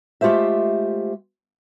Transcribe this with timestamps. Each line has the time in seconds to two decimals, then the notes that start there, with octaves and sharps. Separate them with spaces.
0.21 G#3 A3 F4 G4 C5 E5